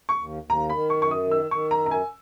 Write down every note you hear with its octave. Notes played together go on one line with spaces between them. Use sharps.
C#6
D#2
D#2
A#5
D#3 B5
C#6
F#2
C#6
D#6
D#3
E6
D#3 C#6
A#5
F#2
A#5
G#5